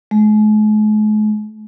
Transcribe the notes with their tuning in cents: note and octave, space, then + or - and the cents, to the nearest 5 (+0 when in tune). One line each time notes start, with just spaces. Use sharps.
G#3 +45